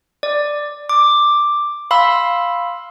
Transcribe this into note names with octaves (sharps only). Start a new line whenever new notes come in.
D5
D6
F5 B5 C6 E6